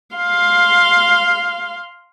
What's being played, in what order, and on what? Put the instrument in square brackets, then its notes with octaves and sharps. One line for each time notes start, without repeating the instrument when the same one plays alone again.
[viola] F5 C6